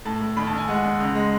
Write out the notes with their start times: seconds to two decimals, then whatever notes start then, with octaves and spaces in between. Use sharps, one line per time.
0.05 A2 A5
0.21 A2
0.37 D#2 B5
0.47 A5
0.53 D#2 G#5
0.68 G#3 F#5
0.84 D#2
1.00 C#2
1.15 G#3